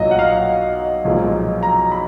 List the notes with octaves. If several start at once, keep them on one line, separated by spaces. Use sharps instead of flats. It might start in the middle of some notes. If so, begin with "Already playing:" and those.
Already playing: B1 A#2 F#3 D#5
F#5
F5
B1 A#2 F3 G#3
A#5
B5